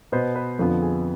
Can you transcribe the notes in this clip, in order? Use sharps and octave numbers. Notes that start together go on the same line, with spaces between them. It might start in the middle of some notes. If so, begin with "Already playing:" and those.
B2 B3 C5
B4
F2 D3 F3 B3 A4
G#4